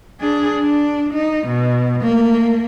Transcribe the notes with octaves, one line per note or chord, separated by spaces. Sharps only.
D4 G#4
D4
D#4
B2
A3 A#3